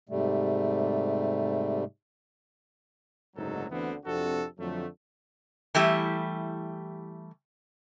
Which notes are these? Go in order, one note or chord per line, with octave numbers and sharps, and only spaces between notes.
G#2 C3 G3 A3
F#1 D2 G#2 F#3 D#4 A4
D2 D3 E3 B3 C4
F2 C3 D4 F#4 A4
F2 D3 F#3 A3
E3 G3 A3 E4 G4